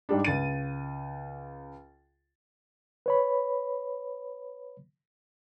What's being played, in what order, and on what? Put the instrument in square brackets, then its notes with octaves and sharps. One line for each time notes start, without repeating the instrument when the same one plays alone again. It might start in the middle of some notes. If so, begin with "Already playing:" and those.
[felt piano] G#2 G3 D4
C#2 A6 D#7
[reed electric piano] B4 C#5 B5